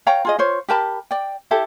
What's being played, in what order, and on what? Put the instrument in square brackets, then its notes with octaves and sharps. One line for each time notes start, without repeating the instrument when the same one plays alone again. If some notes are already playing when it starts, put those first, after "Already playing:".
[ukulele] C#5 F5 G5 A#5
F4 G#4 D#5
F4 C5 C#5
G4 A#4 A5 B5
D5 G5
E4 G4 A4